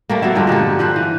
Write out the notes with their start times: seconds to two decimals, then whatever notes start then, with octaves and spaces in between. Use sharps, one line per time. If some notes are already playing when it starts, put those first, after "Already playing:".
0.09 G3 A3 A#3
0.22 F#3 A#3 B3 E5
0.35 G2 D3 F3 G#3
0.47 A#2 D3 G4 A4
0.79 F3 B4 C5
0.96 E3